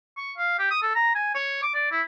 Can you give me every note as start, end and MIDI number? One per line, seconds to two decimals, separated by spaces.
0.17 0.33 85
0.38 0.59 77
0.59 0.67 67
0.71 0.80 87
0.83 0.92 69
0.96 1.14 82
1.15 1.33 80
1.35 1.61 73
1.63 1.71 86
1.75 1.89 74
1.92 2.02 64